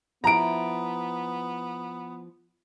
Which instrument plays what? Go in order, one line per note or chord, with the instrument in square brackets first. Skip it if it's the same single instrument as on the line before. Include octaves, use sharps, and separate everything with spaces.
[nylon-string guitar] F3 E4 [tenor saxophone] B3 [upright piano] A#5 D7